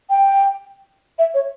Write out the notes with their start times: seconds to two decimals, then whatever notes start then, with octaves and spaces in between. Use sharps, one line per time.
0.10 G5
1.19 E5
1.34 C#5